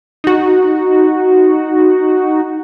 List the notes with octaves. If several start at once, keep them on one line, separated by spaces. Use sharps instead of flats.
D#4 F#4